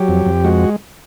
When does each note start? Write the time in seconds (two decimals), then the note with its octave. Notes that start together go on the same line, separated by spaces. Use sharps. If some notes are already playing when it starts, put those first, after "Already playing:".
Already playing: F#3 G4
0.08 F2
0.26 F2
0.44 G#3 F#4